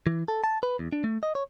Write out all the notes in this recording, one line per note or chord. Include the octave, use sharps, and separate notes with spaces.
E3
A4
A5
B4
E2
D4
A3
D#5
C#5